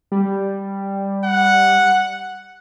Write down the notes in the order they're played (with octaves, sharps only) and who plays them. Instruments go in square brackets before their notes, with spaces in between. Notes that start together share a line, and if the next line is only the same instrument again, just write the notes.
[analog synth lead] G3
[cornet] F#5